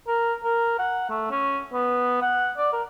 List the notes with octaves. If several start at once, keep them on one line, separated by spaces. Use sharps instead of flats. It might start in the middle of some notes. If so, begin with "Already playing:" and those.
A#4
A#4
F#5
A3
C#4
B3
F#5
D5
A#4